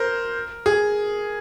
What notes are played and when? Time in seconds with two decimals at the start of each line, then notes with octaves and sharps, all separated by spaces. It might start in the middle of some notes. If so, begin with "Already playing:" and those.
Already playing: A#4 C5
0.66 G#4